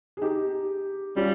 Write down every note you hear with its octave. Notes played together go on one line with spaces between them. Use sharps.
G#4
D#4 G4
G3 C#4 F4